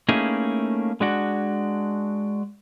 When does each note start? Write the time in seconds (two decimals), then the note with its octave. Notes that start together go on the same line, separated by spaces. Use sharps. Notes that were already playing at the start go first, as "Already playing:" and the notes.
0.08 A3 A#3 C#4 D#4 E4 G#4
1.01 G#3 D4 F#4